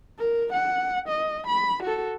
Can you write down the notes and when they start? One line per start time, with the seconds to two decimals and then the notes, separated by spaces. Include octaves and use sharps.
0.19 A#4
0.53 F#5
1.08 D#5
1.47 B5
1.83 F#4 A4